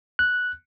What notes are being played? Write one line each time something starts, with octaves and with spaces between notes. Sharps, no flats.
F#6